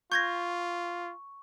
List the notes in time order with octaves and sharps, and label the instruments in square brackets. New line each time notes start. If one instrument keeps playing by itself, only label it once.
[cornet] F4 [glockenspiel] C#6 [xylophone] G6 G#6 A#6